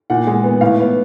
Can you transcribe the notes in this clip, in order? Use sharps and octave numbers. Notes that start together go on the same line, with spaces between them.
A#2 F#5
G#3
B3
A2 F5
B3